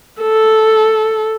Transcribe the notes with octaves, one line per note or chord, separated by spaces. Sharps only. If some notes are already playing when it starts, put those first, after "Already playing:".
A4